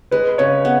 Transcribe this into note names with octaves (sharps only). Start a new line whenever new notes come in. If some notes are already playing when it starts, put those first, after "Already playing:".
G#3 B4
C#3 C#5
B3